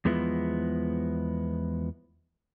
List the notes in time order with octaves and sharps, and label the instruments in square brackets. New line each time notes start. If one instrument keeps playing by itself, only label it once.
[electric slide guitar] E2 F3 G#3 B3 E4